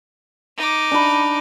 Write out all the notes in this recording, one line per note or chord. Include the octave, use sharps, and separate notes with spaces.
D#4 D6
D4 B5